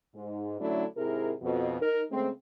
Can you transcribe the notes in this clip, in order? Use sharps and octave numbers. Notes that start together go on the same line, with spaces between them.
G#2
D3 F#3 A3 C#4 D4 E4
G#2 C3 E4 G#4 A#4
F2 B2
D#4 A#4
C#3 G#3 A3 C4